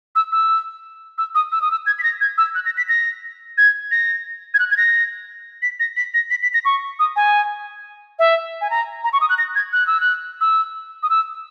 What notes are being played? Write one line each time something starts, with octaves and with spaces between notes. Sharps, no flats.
E6
E6
E6
D#6
E6
D#6
E6
G#6
B6
A#6
G#6
E6
F#6
A#6
B6
A#6
G#6
A#6
G#6
F#6
G#6
A#6
B6
A#6
B6
A#6
B6
B6
A#6
C#6
D#6
G#5
E5
G#5
A#5
A#5
C#6
D#6
F#6
A#6
G#6
F#6
E6
F#6
E6
D#6
E6